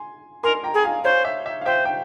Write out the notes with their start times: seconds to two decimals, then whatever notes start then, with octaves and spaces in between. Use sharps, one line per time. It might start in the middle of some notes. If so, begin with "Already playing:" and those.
Already playing: G#5 C6
0.43 A#4 G#5 C6
0.64 G5 A#5
0.74 G#4
0.84 F5 G#5
1.04 C5 C#5 F5
1.25 E5
1.46 E5
1.61 F5
1.66 C5 E5 G5
1.85 G5